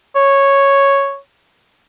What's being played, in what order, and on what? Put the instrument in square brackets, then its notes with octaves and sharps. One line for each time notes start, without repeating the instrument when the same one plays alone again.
[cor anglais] C#5